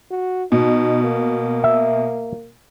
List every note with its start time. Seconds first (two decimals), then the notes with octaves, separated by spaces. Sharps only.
0.11 F#4
0.52 B2 D#4
1.04 A#3
1.64 E5